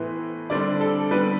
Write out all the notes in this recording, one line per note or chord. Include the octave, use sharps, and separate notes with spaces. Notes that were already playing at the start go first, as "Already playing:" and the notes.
Already playing: A2 E3 B3 C5
D3 G3 C4 D5
A4
D3 G3 B3 B4